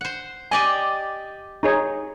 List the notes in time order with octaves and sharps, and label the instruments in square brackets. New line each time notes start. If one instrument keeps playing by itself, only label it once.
[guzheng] C5 F#5
[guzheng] G4 D5 D#5 [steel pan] G#5
[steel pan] D#4 G#4 C#5